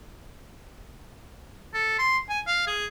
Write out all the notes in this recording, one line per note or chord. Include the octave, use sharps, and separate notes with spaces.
A4
C6
G#5
F5
G#4